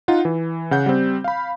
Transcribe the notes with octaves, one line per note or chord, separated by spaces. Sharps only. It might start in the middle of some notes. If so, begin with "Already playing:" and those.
D#4 F4 F#5
E3
C#3 F#5 G6
G3 C4
F5 B5